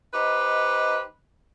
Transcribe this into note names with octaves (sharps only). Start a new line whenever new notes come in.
D#4 G4 B4 C5 D#5